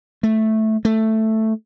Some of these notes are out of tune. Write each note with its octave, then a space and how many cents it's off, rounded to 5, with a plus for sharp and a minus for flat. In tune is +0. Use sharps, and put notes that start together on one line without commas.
A3 -5
A3 +5